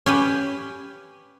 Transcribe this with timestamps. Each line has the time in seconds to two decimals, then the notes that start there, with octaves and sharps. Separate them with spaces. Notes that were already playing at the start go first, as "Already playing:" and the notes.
0.06 C#4 G4 B4